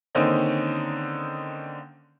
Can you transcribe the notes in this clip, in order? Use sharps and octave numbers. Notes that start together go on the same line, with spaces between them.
D3 D#3 A#3 C4 C#4 D#4